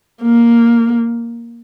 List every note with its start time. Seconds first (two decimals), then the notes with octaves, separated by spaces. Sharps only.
0.22 A#3